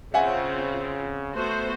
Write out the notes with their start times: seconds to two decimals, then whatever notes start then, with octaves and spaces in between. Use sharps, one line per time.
0.14 C#3 C4 F4 E5 F#5 G#5
1.35 A3 B3 F#4 C5